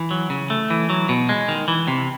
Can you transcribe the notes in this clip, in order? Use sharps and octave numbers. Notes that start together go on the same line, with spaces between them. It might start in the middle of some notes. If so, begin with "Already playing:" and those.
Already playing: E3
F#3
C#3
A3
E3
F#3
B2
G#3
D#3
E3
C3